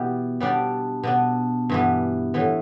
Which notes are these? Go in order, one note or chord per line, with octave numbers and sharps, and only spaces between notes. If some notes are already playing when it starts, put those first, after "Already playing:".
Already playing: B2 E3 G3 B3 G4
G3 B3 D4 G4 D5
B2 B3 D4
G2 E3 B3
A2 E3 B3